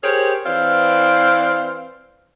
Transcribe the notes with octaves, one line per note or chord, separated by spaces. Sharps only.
G4 G#4 A#4 C5 C#5
E3 C4 C5 D5 F5